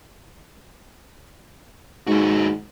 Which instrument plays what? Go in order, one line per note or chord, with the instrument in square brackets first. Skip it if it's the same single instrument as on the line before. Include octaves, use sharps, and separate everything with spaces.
[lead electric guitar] D#2 F#4 [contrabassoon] G#2